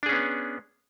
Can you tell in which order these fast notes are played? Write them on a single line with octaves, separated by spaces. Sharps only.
D4 G#4 C#4 B3